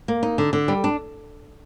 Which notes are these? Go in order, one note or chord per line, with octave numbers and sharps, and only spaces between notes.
A#3
D#4
D3
D3
G3
D4